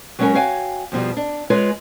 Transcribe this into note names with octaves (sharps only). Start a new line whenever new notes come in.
F#3 G#3 C#4 F#4 A#4 G#5
F#4 C#5 F5 G5 G#5
F2 B2 F3 G3
D4
G#3 F4 B4 C#5 G#5